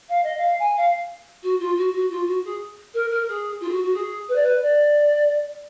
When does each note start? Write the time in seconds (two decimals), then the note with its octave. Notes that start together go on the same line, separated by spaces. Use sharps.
0.08 F5
0.23 D#5
0.37 F5
0.59 G#5
0.76 F5
1.42 F#4
1.60 F4
1.77 F#4
1.93 F#4
2.10 F4
2.27 F#4
2.44 G#4
2.94 A#4
3.10 A#4
3.28 G#4
3.60 F4
3.68 G#4
3.72 F#4
3.83 F#4
3.94 G#4
4.28 B4
4.35 D5
4.42 B4
4.61 D5